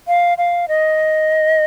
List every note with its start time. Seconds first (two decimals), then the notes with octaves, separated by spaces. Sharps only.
0.07 F5
0.38 F5
0.68 D#5